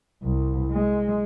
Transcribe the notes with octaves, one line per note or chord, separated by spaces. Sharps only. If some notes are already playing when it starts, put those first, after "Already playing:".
C2
G#3